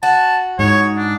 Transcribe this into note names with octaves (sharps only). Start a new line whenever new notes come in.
F#4 A5
G#2 C#5
D4